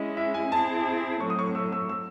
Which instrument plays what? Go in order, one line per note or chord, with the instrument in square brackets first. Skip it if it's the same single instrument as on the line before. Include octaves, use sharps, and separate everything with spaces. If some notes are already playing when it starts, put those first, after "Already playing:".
Already playing: [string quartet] G#3 C#4 E4 [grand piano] D#5
[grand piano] E5
G#5
[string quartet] C4 E4 G#4 [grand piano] A5
[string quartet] A2 F#3 C4 [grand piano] C#6
[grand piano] D#6
C#6
E6
E6
E6